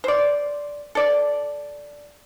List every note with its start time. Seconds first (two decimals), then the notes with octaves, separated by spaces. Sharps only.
0.04 C5 D5
0.95 A4 D5